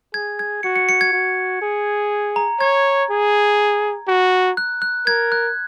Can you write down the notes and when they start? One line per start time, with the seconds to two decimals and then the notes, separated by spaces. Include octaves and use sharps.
0.14 G#4 G#6
0.39 G#6
0.63 F#4 C#7
0.76 C#7
0.89 C#7
1.01 G#6
1.13 F#4
1.62 G#4
2.36 A#5
2.60 C#5 G#6
3.10 G#4
4.07 F#4
4.57 F#6
4.82 F#6
5.07 A#4 G#6
5.32 F#6